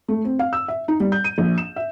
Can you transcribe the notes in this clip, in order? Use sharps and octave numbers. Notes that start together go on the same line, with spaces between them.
A3
C4
F5
E6
E5
D#4
G3
G6
D#7
A#1
E7
E5